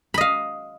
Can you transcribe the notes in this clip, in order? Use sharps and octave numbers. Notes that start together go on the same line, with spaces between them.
D#5 F5 B5